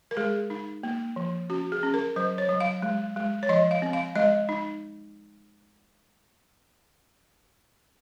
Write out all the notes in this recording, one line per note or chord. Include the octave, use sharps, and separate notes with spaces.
A#4
G#3 G#4
D#4
A#3
F3
C#4 F#4
G#4
C#4
A#4
F#3 C5
C#5
F#3
F5
G#3
G#3
C#5
F3 D#5
F5
C4
F5
G#3 D#5
D#4